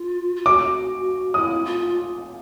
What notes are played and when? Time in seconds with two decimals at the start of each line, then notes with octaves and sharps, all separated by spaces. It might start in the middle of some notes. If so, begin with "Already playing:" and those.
Already playing: F4
0.36 F4
0.46 F#4 D6
1.34 E4 D#6
1.65 F4